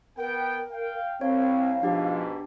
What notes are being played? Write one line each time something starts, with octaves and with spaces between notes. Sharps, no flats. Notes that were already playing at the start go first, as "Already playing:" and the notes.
B3 A#4 G5
F5 G5
C2 C4 C#5 F5
G#2 B2 F3 D4 G4